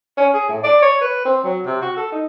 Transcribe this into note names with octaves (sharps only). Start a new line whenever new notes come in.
C#4
G#4
A2
D5
C#5
B4
C4
F#3
C3
F#4
A4
D#4